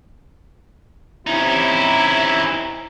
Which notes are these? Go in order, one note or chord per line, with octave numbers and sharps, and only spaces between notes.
C3 C#4 D#4 E4